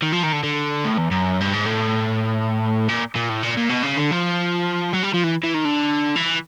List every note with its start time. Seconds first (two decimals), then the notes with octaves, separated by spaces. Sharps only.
0.03 D#3
0.13 F3
0.23 D#3
0.33 D3
0.43 D3
0.84 A2
0.98 E2
1.11 F#2
1.41 G2
1.54 G#2
1.66 A2
2.89 A#2
3.16 A#2
3.30 A2
3.43 A#2
3.57 A#2
3.70 B2
3.83 C#3
3.97 D3
4.12 F3
4.93 F#3
5.03 G3
5.14 F3
5.24 E3
5.43 E3
5.54 D#3
5.65 D3
6.16 E3